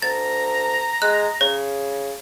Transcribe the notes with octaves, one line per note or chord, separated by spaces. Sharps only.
D2 A#5 A6
G#3 F#6
C#3 C#5